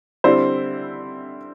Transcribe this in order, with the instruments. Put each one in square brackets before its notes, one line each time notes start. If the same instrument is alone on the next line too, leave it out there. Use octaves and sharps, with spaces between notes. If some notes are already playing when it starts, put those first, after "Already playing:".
[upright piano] D3 G3 C4 E4 C5